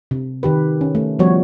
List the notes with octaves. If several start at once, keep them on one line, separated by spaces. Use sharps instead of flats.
C3
D#3 G4 B4
C#4
A3
F3 G3 B3 F#4 C#5